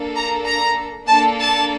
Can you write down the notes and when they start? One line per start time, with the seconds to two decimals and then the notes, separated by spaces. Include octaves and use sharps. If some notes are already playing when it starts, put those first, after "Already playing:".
Already playing: A#3 D4 A4
0.16 A#5
0.46 A#5
1.07 A#3 D4 A4 A5
1.39 A5